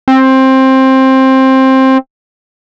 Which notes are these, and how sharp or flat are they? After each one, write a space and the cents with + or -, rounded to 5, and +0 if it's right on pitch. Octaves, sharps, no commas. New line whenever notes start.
C4 +15